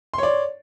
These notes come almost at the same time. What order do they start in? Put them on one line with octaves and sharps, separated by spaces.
C6 C#5 D5